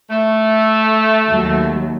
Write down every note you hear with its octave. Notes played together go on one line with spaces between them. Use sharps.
A3
D#2 F#3